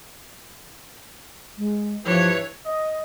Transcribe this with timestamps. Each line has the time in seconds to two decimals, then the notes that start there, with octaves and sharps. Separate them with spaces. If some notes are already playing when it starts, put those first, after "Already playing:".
1.58 G#3
2.05 G2 E3 F3 C#5
2.66 D#5